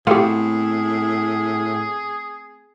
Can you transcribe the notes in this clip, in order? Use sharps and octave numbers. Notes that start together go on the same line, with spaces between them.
A2 A3 B3 C4 F4 G4 G#4